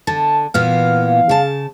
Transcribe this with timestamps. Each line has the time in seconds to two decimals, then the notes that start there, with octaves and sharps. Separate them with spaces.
0.07 D3 A5
0.54 A#2 E3 B3 F5
1.29 C#3 A5